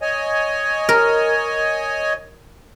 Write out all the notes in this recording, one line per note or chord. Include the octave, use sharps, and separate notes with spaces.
C#5 D#5 G#5
A#4